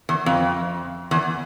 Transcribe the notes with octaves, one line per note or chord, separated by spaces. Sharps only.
E2
F2
E2